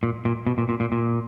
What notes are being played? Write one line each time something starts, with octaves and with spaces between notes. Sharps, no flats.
A#2
A#2
B2
A#2
A#2
A#2
A#2